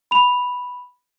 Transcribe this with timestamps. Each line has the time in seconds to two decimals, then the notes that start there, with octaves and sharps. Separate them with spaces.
0.11 B5 F7